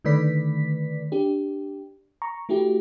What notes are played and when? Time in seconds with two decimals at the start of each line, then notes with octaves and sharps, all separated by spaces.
0.05 D3 D#3 A3 B4 D5 B6
1.12 D4 G4
2.22 A#5 C#6
2.49 A3 E4 F#4 G4